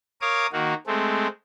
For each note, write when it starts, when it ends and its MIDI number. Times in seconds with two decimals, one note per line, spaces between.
0.21 0.47 70
0.21 0.47 73
0.21 0.47 77
0.21 0.47 86
0.21 0.47 87
0.52 0.74 51
0.52 0.74 58
0.52 0.74 66
0.87 1.27 56
0.87 1.27 57
0.87 1.27 60